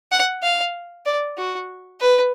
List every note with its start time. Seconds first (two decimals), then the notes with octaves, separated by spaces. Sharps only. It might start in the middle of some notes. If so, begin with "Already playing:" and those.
0.12 F#5
0.43 F5
1.06 D5
1.38 F#4
2.01 B4